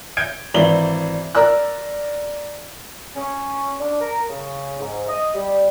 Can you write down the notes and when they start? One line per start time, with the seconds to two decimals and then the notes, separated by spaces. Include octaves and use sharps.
0.17 G6 G#6 D7
0.54 G#1 E3 D5 E5 F#7 G7
1.35 A#4 D5 E6 F#6
3.16 C#4
3.80 D4
4.00 A#4
4.29 C#3
4.80 G#2
5.08 D#5
5.35 G3